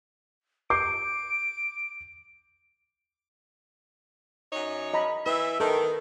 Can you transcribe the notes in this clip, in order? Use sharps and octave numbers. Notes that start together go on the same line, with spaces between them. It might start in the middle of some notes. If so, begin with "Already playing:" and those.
D6 G6 C7 D7
F#2 D#4 C#5
D#5 A#5 B5
E3 B4 E5
D#3 A4 B4